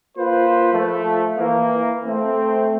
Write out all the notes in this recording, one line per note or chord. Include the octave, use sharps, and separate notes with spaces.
A#3 F4 B4 C5
F3 A3
E3 A#3
A3 C4